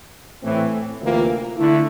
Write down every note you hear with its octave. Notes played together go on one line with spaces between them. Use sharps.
A2 E3 A3 C4
D2 C3 E3 A#3 F4
D3 A3 E4